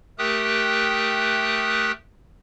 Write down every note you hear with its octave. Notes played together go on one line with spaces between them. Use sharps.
A3 G4 A#4 G5 D#6 F#6